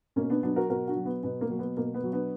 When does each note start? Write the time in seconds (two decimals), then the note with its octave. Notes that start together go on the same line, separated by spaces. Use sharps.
0.16 B2 A#3 C#4
0.30 B3 D4
0.43 F#3 B3 D4
0.56 F#4 A#4
0.70 B2 F#4 A#4
0.88 D4 F#4
0.96 F#3
1.05 B3
1.23 B2 B3
1.41 A#3
1.50 F#3
1.59 B3
1.77 B2 A#3
1.94 B3
2.04 F#3
2.12 B3 D4